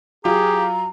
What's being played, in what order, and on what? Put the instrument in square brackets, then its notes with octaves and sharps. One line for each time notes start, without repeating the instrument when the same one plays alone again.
[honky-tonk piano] F#3 F4 [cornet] G4 [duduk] G#4 [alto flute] A#5